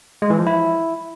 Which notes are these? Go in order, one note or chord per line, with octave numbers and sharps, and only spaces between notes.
G#3
E3
F3
E4